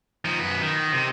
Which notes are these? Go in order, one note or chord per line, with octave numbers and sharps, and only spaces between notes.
F3 D#4
F#2 B4
D#3
C3